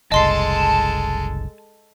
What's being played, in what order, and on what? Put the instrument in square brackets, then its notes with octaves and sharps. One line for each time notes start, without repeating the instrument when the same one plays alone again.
[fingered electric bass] F#1 C2 [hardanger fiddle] G#3 A4 [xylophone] D#5 C6 C7 [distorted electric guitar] A5